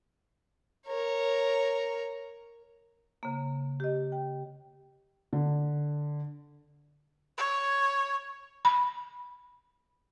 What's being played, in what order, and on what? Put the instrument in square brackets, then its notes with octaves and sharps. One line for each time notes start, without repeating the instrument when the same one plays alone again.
[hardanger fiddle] A#4 C#5
[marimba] C#3 A#3
G4 D#5
G5
[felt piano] D3
[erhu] C#5
[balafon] B5